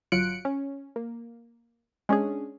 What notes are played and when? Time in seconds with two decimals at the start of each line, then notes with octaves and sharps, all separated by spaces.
0.12 G1 F#3 F4 F#6 C#7 D7
0.45 C#4
0.96 A#3
2.09 G#3 C#4 D4 G#4